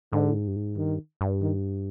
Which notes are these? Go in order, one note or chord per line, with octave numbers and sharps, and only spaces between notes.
G#2 D3
A2
G#2
G2
G#2
G2 D#3
G2
D#3